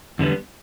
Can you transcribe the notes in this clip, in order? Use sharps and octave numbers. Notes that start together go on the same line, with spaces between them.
E2 D3 G3 B3